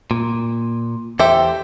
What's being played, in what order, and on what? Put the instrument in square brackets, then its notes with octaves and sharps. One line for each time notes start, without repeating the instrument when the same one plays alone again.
[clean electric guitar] A#2
[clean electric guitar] E2 A4 C5 [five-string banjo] G4 E5